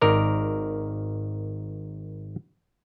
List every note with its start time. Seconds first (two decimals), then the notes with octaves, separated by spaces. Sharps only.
0.01 G#1 D#3 A#4 D5